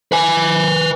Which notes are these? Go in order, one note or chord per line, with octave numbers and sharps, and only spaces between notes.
B4 G#5